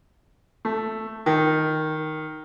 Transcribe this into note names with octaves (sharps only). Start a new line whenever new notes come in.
A3
D#3